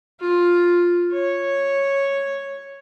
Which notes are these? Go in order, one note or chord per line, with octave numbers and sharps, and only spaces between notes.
F4
C#5